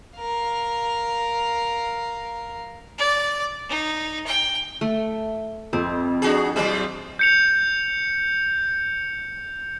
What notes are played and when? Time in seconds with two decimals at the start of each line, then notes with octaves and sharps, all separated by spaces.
0.18 A#4 F5
2.98 D5
3.69 D#4
4.26 G5
4.81 A3
5.73 F2 C4
6.22 D4 F#4 G#4
6.56 B2 E3 F#3 C5
7.19 G6 C#7 F7